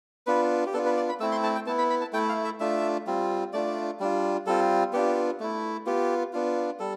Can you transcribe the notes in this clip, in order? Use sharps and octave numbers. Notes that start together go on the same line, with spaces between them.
B3 D4 F4 B4
G4
B3 D4 F4 A4
B4
D5
B5
A3 C4 E4 E6
C6
A5
G5
B3 E4 A5
B5
B5
A5
A3 E4 G5
F5
E5
A3 D4 F4 E5
G3 C4 F4
A3 D4 F4 D5
G3 D4 F4
G3 C4 F4 A4
B3 D4 F4 G4
A3 E4
B3 F4 G4
B3 D4 F4
G3 A4